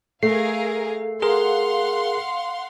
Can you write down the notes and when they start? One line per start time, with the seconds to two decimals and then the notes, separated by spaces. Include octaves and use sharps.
0.23 A3 G#4 A#4 F5 C7
1.22 G#4 A#4 F5 F#5 C6